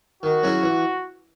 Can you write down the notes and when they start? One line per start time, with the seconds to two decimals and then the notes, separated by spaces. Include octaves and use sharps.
0.23 D#3 F#4
0.43 F#3 C#4 E4 G#4
0.63 E3